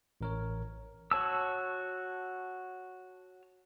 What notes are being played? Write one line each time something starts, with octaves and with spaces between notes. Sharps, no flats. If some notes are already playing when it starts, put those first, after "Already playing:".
A1 A#4 C#5
F#4 C#5 A5 E6